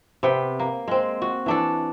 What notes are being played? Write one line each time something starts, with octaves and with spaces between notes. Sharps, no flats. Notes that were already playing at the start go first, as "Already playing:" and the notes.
C3 B3 G5
A#3
G#3 C4
F#4
E3 D4 A4